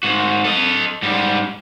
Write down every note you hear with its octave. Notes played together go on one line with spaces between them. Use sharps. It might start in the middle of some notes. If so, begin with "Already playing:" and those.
G#2 F#4
A4 D#5
G#2 G3